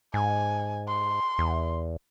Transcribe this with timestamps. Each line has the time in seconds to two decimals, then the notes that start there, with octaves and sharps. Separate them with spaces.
0.14 G#2 G#5
0.88 C6
1.39 E2